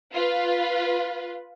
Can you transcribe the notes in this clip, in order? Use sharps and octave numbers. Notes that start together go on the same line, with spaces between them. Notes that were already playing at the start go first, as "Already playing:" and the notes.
F4 B4